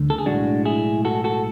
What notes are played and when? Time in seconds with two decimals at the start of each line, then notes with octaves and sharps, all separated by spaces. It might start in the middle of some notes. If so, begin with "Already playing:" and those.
Already playing: D2 D3 A3
0.10 A4
0.18 G#4
0.26 B1 A2 G#3 D4 F#4
0.65 E4 G#4
1.05 F#4 A4
1.24 F#4 A4